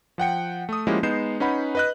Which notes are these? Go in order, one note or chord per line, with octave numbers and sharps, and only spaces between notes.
F3 F#5 G5 C#7
A3 D#6
F3 G#3 A#3 C#4 E4 G4
G#3 B3 D#4 G6 C7 E7
C#4 D#4 B4 F#5 B5
B4 D#5 F#6